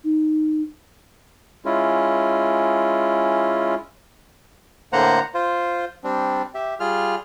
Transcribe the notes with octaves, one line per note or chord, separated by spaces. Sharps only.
D#4
G#3 C#4 E4 F4
A2 D3 A#3 C5 F#5 A#5
F4 C5
G3 C4 D4
G4 E5
G3 F4 G#4 F6